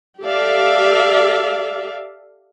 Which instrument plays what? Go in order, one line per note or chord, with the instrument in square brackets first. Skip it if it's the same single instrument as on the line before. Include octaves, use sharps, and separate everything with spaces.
[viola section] G4 A4 D5 E5 F5